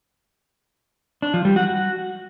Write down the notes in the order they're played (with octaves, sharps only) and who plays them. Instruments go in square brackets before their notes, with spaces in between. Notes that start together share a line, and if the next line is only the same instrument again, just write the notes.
[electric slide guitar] D4
F3
G3
F#4